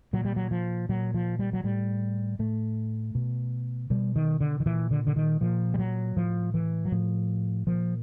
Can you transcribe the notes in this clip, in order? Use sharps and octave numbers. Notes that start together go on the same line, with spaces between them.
A#2 F#3
G3
F#3
F3
A#2 F#3
F3
G3
F#3
A2 G3
A2 A3
B2
B2 G3
D#3
D3
D#3
A#2 E3
D3
D3
D#3
A#2 F3
G3
F#3
A2 F3
E3
F#3
A2 F3
A#2 F3